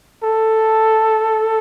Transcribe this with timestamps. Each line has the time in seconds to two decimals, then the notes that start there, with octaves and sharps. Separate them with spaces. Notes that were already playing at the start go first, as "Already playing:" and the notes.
0.23 A4